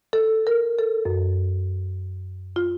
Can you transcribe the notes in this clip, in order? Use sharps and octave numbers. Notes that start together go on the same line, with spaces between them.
A4
A#4
A4
F#2
F4